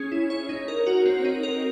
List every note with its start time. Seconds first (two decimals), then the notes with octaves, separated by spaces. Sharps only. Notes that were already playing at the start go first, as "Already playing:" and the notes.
Already playing: C#4 G#4 C#5
0.12 E4
0.30 C#5
0.49 D#4
0.68 A#4
0.86 F#4
1.05 C4
1.25 D#4
1.43 A#4